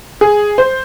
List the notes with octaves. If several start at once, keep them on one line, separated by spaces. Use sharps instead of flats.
G#4
C5